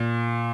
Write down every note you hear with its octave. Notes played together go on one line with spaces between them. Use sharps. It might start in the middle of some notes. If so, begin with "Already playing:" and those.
Already playing: A#2